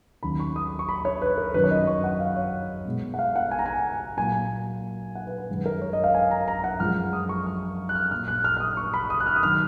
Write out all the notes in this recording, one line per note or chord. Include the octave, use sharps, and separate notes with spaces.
D#2 D#3 F#3 C#4 B5
C#6
D#6
C#6
B5
C#5
B4
A#4
F#2 D#3 F#3 C#4 B4
C#5
D#5
C#6
F#5
F5
C#5
B2 G#3 B3
F#5
F5
F#5
G#5
A#5
G#5
A#2 F#3 A#3 G#5
F#5
B4
B4
F#2 D#3 G#3
A#4
C#5
D#5
F5
G#5
A#5
A#5
F#5
F#2 F3 G#3 F6
D#6
C#6
F6
F#6
F6
A#2 F#3 A#3 F6
F#6
F6
F6
D#6
C#6
B5
D#6
F#6
F6
D#6
D#3 F#3 F6